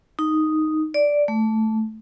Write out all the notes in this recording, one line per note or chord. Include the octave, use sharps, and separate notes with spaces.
D#4
D5
A3